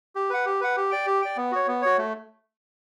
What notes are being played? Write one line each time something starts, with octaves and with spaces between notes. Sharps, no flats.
G4
B4 F#5
G4
B4 F#5
G4
D5 G5
G4
D5 G5
B3
F#4 C#5
B3
F#4 C#5
A3